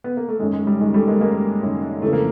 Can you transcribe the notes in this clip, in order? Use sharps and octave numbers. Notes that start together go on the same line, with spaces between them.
B3
A#3
A3
F#2 D#3 G#3
G#3
G3
F#2 D#3 G#3
G3 A3
G#3 A#3
F#2 D#3 G#3 A#3
F#2 D#3
F2 C#3 E3 A3
A#3